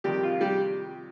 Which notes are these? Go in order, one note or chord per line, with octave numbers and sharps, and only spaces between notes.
F2 C3 D#3 G3 G4
F4
G3 G4